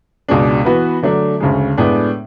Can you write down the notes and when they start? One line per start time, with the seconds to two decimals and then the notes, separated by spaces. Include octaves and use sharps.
0.28 C#2 B2 G#3 D4
0.65 E3 B3 F#4 B4
1.03 D3 F#3 A3 D4
1.40 D2 C#3 G#3
1.77 A2 G#3 B3 D4